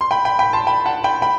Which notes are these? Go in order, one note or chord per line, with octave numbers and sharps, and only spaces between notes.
C6
G5 B5
G5 B5
G5 B5
A5 C6
G5 B5
F#5 A5
G5 B5
G5 B5